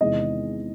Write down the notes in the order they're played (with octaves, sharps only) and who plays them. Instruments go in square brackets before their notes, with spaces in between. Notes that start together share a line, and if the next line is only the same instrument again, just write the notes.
[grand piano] E2 C3 D#3 G#3 D#5